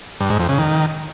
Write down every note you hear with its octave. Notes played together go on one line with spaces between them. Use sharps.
G2
G#2
F2
C#3
D#3